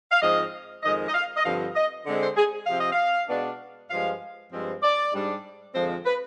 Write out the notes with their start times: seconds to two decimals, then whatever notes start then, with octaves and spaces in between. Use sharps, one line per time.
0.11 F5
0.22 G#2 F3 C4 D#5
0.83 F2 D#3 G#3 D#5
1.08 D#5
1.14 F5
1.37 D#5
1.44 G2 D3 F3 C4 F5
1.76 D#5
2.06 D3 G#3 C4
2.21 C5
2.37 G#4
2.66 C3 F3 C4 F5
2.79 D#5
2.92 F5
3.28 B2 G#3 B3 D4
3.90 G2 F3 G#3 F5
4.52 G2 F3 G#3 C4
4.82 D5
5.13 G#2 G3 D4
5.74 F2 D3 F3 G#3 C4 C5
6.05 B4